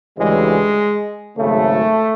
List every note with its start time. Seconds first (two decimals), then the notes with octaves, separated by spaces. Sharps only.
0.17 D2 C#3 E3 G3 G#3
1.36 G#1 F#2 C#3 A3